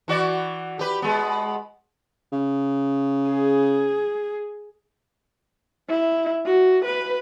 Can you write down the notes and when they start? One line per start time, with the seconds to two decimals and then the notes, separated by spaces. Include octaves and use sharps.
0.08 E3 F#4 D5
0.79 G4 B4
1.02 G#3 B3
2.32 C#3
3.30 G#4
5.89 E4
6.46 F#4
6.85 B4